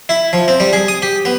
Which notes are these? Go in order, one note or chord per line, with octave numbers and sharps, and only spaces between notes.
E4
F3
C4
G3
G#4
D#6
G4
B3